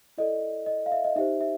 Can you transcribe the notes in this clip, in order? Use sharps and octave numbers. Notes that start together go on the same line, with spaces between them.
E4 A4 D5 D#5
D#5
F5
E5
D#5
D#4 G4 C5 E5
E5